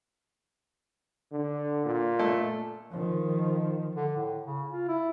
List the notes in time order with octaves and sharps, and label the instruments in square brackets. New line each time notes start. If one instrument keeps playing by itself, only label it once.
[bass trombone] D3
A#2
[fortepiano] A3
[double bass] D#3 F3
[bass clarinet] D3
A2
C#3
F4
E4